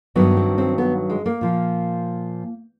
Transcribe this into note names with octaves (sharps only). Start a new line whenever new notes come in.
G2 D#3 F#3 B3
C4
C4
B3
G#3
A#3
A#2 F3